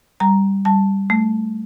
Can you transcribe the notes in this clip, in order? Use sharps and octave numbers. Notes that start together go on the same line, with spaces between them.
G3 A#5
G3 A5
A3